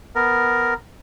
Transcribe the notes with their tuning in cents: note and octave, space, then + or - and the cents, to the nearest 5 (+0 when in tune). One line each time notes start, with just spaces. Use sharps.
B3 +0 A#4 +0